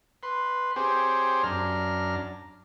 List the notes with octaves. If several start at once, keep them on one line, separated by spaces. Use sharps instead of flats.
B4 C6
C4 G4 G#4 C5 C#5
F#2 D4 A#5 F6